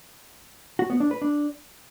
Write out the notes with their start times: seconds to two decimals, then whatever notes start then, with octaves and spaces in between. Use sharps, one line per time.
0.79 F#4
0.90 B3
1.00 D4
1.11 B4
1.22 D4